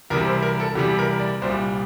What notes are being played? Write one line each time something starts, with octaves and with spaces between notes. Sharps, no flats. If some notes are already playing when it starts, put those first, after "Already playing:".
E2 C3 G3 A#4
C5
A#4
A4
E2 C3 G3 G4
A#4
D5
C2 A#2 G3 C5